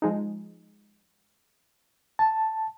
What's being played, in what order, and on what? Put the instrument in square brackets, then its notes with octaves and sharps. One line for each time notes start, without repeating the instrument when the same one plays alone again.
[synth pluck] F3 G#3 D#4
[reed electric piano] A5